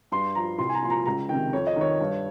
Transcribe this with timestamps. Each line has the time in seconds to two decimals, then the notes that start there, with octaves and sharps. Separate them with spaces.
0.12 G2 C6
0.35 F3 A#5
0.58 C2 C6
0.69 G#5
0.74 A#5
0.82 A#2 C6
0.87 F3 A#5
1.06 C#2 A#5
1.29 C3 D#3 G5
1.53 F2 C#5
1.67 D#5
1.76 D#3 C#5
2.00 G2